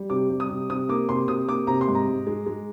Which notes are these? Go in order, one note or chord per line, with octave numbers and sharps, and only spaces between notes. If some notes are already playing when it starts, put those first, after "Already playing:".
Already playing: G3
C3 D6
G3
D#6
C3
C3 D#6
A#3 D6
C3 C6
C3 D#6
A#3 D6
C3 A#5
C6
G#2
A#5
G#2
G#3
G#3